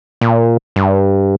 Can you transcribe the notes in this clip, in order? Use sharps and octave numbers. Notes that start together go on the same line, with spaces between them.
A#2
G2